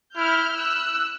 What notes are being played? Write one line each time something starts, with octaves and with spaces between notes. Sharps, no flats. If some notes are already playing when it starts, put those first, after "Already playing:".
E4 F6 G6
E6 F#6